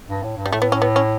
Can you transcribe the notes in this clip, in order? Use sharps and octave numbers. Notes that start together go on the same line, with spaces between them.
G2
A2
G2
G3
A2 A3
B3
C#4
B3
C#4